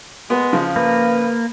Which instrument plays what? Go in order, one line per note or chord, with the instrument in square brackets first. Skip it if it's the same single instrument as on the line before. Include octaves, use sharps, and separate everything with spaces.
[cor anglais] G#3 [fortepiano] B3
[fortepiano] C#3 F3
[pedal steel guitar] A#3 [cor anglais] B4